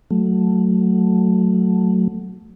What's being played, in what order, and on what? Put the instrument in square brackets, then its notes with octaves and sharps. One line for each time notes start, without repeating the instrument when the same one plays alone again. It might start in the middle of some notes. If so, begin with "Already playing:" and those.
[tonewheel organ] F#3 A3